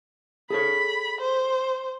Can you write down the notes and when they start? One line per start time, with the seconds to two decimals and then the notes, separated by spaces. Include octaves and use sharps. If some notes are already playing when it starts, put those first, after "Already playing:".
0.50 G#4 A4 C#5 B5
1.21 C5